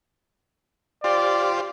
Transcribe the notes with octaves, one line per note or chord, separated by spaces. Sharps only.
F4 G4 C5 D5